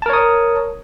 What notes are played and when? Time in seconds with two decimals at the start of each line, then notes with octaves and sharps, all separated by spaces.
0.02 A5
0.06 A#4
0.10 C#5
0.13 D#6